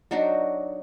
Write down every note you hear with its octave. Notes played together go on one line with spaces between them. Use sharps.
F#3 D4 D#4 F#4